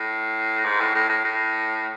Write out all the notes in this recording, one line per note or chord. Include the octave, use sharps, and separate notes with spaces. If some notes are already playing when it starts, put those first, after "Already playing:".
Already playing: A2
G#2
A2
A2
A2
A2